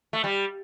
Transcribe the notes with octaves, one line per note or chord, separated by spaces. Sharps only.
A3
G3